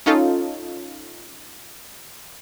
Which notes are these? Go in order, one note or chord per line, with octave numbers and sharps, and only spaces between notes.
C#4 D#4 F4 A4